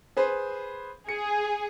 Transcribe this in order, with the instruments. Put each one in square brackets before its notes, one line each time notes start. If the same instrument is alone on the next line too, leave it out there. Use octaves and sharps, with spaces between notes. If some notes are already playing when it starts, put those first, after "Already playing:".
[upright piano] G#4 B4 C5
[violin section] G#4 [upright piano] C#7